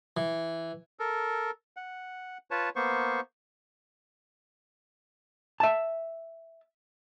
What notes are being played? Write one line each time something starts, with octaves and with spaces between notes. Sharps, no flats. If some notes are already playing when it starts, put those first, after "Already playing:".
E3
A4 A#4
F#5
F4 B4 C#5 A5
A#3 B3 C5 C#6
E5 A5